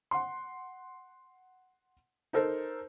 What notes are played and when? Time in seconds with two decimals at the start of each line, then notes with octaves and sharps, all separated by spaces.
0.11 F#5 C6
2.33 D#4 A4 A#4 C5